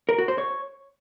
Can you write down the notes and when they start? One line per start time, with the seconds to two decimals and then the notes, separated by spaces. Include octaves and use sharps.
0.09 A#4
0.18 F#4
0.28 C5
0.38 C#5